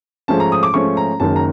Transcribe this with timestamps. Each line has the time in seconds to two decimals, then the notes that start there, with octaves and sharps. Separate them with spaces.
0.28 G#2 F3 A3 C#4 A5
0.40 A#5
0.52 D#6
0.63 D6
0.74 G#2 F3 A3 C#4 C#6
0.97 A#5
1.20 F#1 F#2 D#3 G#3 A5
1.36 A#5